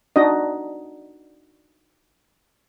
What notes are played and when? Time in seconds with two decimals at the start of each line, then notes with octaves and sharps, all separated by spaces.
0.16 D4 D#4 F#4 D#5